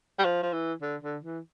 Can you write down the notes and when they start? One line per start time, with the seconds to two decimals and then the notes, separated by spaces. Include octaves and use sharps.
0.19 G3
0.24 F3
0.43 F3
0.53 E3
0.82 D3
1.03 D3
1.24 E3